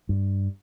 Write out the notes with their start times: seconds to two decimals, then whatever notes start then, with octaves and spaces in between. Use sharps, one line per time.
0.09 G2